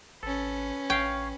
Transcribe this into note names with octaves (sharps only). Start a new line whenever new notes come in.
G#1 C#4 A4 B4
A1 C#5 F5 G5